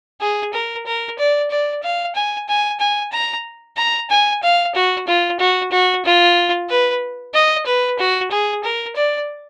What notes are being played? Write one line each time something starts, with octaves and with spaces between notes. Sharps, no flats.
G#4
A#4
A#4
D5
D5
F5
G#5
G#5
G#5
A#5
A#5
G#5
F5
F#4
F4
F#4
F#4
F4
B4
D#5
B4
F#4
G#4
A#4
D5